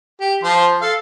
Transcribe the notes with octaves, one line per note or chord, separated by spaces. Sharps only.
G4
F3 C5 C6
A4 F5